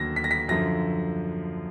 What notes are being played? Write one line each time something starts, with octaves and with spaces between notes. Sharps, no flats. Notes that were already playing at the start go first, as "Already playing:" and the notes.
Already playing: D#2 D3 F#3 A3 A#6
B6
A#6
B6
F#2 D3 F3 A#6